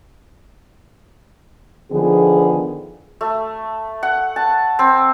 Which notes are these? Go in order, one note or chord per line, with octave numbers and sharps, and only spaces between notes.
D3 D#3 F3 B3 G#4
A3
F#5
A5
C4